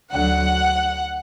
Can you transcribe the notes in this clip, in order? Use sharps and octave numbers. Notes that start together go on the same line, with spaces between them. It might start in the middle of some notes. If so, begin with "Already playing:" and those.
D2 D3 F#3 F#5